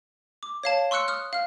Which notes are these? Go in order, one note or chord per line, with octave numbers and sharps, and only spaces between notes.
D6
C#5 F5 A5
C6 C#6 E6 F#6 C#7
D#6 F6 F#6
F5 F6